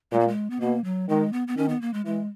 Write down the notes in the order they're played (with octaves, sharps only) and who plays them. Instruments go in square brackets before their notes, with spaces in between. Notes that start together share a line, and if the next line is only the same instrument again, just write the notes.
[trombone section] A#2 [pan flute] G#3
[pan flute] A#3
G#3
B3
[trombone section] B2 [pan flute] A#3
[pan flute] F#3
[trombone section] D#3 [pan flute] G#3
[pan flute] B3
B3
[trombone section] D#3 [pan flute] C#4
[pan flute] B3
A#3
G#3
[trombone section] E3 [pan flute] G#3